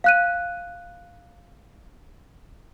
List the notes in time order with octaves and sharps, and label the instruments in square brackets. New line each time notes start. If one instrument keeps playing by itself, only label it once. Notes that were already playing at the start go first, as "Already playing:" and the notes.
[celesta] F5 F#6 D#7